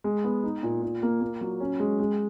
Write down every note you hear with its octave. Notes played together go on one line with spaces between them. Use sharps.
G#3
B3
D#4
A#2
A#2
A#3
A#3
F#3
C#4
G#3
G#3